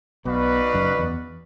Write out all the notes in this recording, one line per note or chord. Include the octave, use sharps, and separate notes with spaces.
B1 B2 D#4 F#4 B4 D5 F5
F#1 F#2
E2